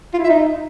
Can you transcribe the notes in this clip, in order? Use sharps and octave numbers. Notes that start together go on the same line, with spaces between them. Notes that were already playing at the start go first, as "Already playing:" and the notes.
F4
E4
E5
D#4